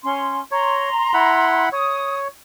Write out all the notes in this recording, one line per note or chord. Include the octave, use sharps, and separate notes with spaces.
C#4 C6
C#5 A#5 C6
E4 F#5 B5
C#5 D#6